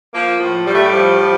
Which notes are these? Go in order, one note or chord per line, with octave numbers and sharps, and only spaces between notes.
F3 A#3
A2 F3
A2 G3
A3
G3
F3
F3